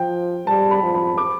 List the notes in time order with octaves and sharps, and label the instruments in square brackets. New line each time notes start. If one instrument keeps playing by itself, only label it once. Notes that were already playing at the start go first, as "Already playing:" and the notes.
Already playing: [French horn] F3 [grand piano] G5
[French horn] G3 [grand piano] A5
[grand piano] B5
[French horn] F3
[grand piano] B5
D6